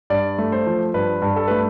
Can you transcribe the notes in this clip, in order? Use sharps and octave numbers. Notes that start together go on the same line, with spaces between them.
G2 D5
A3
C5
F3
G2 B4
G2
A4
A3 B4